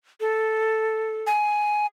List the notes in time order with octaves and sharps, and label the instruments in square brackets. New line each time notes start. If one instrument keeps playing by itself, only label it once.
[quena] A4
[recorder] G#5